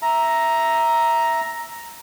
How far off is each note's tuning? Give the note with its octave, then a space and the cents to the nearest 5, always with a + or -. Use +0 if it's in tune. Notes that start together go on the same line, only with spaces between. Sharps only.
E5 +0 A#5 +5